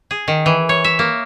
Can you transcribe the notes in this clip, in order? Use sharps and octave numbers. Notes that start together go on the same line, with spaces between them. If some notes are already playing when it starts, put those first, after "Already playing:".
G#4
D#3
E3
C#5
E5
A#3